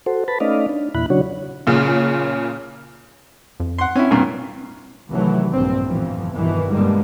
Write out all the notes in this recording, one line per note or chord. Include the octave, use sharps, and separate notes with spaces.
F#4 A4 C5
B4 A5 B5
A3 C#4 D#4 D5 D#5 F5
D4
E2 A#2 E4 B5 F#6
C#3 F#3 D4 F#4 C#5
F#1 A#2 C#3
F2
F#5 C6
C4 C#4 E4
G2 A#2
C2 C3 D#3 E3 F#3 A3
A#1 G2 C4
G1 F2 A2 E3 F3
G1 B2 D#3 E3
G2 B2 D3 G3 G#3 A#3